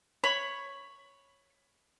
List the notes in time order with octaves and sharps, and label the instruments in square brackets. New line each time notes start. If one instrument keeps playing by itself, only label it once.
[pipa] C#5 [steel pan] B5